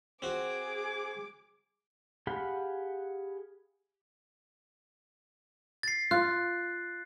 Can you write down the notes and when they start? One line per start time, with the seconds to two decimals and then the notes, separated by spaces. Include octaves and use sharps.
0.22 C4 F#4 G#4 D6
2.27 G4 G#4 F5 F#5 B5
5.83 A6 C7
6.11 F4 F#6